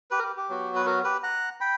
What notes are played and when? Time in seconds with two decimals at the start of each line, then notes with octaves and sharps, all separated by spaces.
0.11 G4 B4
0.19 A#4
0.23 G4
0.37 G4
0.49 F#3 B3 F#4
0.76 B4
0.86 F#4 A#4
1.04 G4 B4
1.23 F#5 A#5
1.61 G5 B5